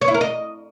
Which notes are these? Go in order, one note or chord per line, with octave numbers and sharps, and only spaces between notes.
C#5
E4
A#4
D#5